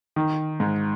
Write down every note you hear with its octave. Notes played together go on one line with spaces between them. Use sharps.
D#3
G#2